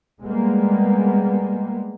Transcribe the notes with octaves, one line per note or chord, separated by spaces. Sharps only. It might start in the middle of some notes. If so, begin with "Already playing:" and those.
G3 G#3 A#3 B3